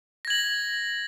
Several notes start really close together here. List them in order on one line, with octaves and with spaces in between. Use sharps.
A#6 G#6 F#7